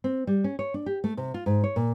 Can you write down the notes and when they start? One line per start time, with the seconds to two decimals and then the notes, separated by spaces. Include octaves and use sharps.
0.04 C4
0.27 G3
0.44 C#4
0.59 C#5
0.74 D4
0.86 G4
1.04 A3
1.17 C3
1.34 F4
1.46 G#2
1.64 C#5
1.76 A#2